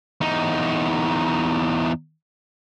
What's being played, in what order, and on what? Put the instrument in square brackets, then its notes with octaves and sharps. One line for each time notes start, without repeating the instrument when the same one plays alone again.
[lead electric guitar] E2 D#4